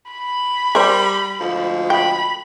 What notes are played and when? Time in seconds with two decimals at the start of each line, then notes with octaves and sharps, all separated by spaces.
0.11 B5
0.75 G3 A#4 C5
1.40 D2 G#2 F3
1.90 G5 B5